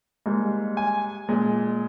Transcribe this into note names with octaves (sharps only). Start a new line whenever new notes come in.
G#2 G3 A#3
G#5
A#2 G#3